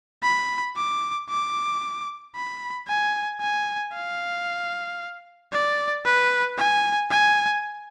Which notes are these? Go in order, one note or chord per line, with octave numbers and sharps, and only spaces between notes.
B5
D6
D6
B5
G#5
G#5
F5
D5
B4
G#5
G#5